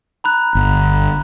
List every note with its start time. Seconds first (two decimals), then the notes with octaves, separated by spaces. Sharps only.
0.24 A#5 B5 F#6
0.55 G1